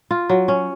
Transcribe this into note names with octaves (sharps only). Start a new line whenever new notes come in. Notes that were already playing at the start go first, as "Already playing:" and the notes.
F4
F#3
C#4